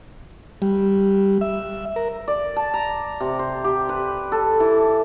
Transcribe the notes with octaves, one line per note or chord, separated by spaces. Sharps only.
G3
E5
A#4
D5
A5
A#5
C3
C5
G4
B4
A4
E3